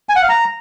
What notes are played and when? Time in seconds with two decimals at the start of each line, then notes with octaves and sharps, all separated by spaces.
0.09 G#5
0.16 F#5
0.22 F5
0.29 A#5